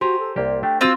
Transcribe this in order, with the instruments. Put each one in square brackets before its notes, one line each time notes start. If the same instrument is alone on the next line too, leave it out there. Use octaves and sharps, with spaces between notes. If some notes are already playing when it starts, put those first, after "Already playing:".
[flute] F#4 [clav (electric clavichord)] G4 G#5 A#5 [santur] C5
[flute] A4
[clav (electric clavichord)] C2 A#3 G4 [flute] D5
[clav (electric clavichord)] A3 D4 G4 [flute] G5
[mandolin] C4 F4 E6 [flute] F#4